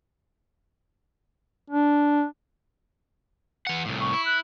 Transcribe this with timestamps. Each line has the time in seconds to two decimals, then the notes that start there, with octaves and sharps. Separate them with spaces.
1.70 D4
3.67 E3 F#5
3.85 C2 A2
4.01 C#6
4.13 E4
4.25 F#6